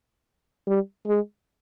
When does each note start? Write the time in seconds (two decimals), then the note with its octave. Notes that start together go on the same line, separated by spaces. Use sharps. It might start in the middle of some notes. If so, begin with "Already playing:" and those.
0.67 G3
1.07 G#3